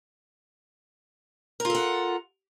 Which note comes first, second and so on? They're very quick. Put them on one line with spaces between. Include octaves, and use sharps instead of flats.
A#4 F4 A4 F#5